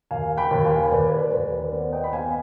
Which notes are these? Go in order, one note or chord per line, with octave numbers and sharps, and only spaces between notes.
D#2 F5 G#5
G5 B5
D#2
F5 G#5
D#2 B4 D5
B4
C5
D#2
B4 D5
B3 C5
D#5 G5
B5
B3 F5 G#5